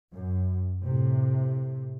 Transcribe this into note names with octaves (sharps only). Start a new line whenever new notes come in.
F#2
A2 C3